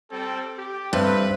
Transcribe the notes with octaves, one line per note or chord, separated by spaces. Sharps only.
G3 C4 A4
G4
G2 C4 B4 C5 E5